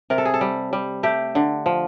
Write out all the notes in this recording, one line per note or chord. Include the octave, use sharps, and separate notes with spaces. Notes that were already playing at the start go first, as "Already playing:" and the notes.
C3 A#4
A4
G#4
A4
G3
G3
A3 G4
D3
F3